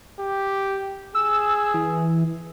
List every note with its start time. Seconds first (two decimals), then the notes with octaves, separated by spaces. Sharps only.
0.19 G4
1.15 G#4 E6
1.74 E3